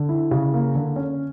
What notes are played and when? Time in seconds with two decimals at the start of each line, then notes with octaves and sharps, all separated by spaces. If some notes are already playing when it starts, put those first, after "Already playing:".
Already playing: D3
0.09 E4
0.31 C#3
0.54 A#3
0.75 D3
0.96 C#4